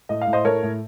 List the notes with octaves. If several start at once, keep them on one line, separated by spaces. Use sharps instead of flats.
A2 D#5
F5
A2
C5 D#5
A3 A#4 C#5
A2